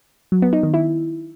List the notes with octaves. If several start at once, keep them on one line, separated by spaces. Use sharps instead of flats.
F#3
B3
D#4
D#3
E4